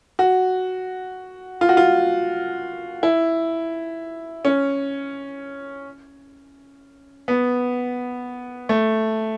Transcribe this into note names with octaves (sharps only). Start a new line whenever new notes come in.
F#4
F4
F#4
F4
E4
C#4
B3
A3